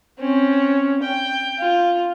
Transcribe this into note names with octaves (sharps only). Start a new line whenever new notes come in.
C4 C#4
G5
F4